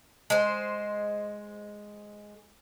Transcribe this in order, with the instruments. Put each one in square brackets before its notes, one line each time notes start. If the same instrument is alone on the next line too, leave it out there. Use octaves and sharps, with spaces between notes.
[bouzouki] G#3 C5